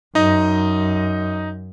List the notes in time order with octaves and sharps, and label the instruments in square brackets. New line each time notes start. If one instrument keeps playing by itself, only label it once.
[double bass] F#2 [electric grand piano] D#4 D#5